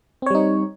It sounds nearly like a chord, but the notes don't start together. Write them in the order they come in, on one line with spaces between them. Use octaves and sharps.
C4 C#5 G3 D#4